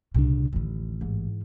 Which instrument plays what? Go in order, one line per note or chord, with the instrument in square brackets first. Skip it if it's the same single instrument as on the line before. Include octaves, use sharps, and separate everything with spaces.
[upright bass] C2 G3 [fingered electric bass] A#2 C#3 D4
[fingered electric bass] A1 [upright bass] D#2 D3
[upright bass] G#2 E3